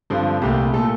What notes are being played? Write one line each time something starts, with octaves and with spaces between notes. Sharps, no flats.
G2 D3 F3 C4
C2 A#2 A3 G4
A#2 A3 A4